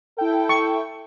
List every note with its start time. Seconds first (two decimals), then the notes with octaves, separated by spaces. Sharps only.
0.18 E4 A4 G5
0.49 C#6